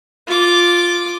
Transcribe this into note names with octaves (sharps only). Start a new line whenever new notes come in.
F4 D6